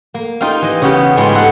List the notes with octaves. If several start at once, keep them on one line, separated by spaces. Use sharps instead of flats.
A#3
D#4 F4 G4 A#4 F5
E3 D#5
C#3 B3 G4
G#2 G#3 B3 F4
A4 F#5